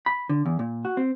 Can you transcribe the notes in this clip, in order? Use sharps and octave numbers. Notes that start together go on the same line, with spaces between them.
B5
D3
E2
A#2
F#4
C4